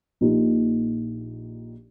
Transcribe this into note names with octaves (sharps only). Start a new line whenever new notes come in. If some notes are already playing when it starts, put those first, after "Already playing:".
A#1 A#2 A#3 D#4 G4